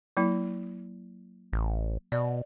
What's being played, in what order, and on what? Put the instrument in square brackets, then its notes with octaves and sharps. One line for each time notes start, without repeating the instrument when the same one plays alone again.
[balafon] F#3 A#3 E4
[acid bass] A1
[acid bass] B2 [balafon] D5